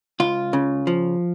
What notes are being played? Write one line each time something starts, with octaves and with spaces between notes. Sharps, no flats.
C#2 F4
C#3
F3